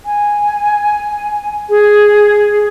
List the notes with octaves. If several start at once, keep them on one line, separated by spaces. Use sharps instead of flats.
G#5
G#4